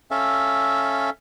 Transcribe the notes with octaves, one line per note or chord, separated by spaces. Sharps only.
C#4 A4 E5 F5